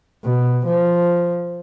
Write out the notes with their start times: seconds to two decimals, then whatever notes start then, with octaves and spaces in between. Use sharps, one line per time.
0.25 B2
0.66 F3